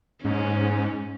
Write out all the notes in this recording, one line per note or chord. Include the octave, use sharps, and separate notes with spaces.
G#2 C#4